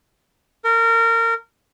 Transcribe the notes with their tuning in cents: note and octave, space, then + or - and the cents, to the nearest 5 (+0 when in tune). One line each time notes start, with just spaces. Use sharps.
A#4 -25